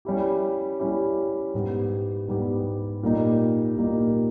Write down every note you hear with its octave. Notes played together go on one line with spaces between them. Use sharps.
G3 C#4 E4 G4
G3 C#4 E4 G4
G#2 G3 B3 G4
G#2 G3 B3 G4
A#2 G3 A#3 D#4
A#2 G3 A#3 D#4